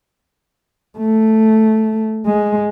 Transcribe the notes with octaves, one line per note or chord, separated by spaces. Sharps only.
A3
G#3